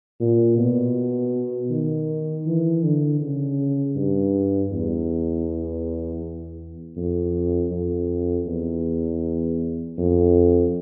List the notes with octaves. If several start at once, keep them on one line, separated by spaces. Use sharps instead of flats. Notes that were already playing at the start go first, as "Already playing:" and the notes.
A#2
B2
D#3
E3
D3
C#3
G2
E2
F2
F2
E2
F2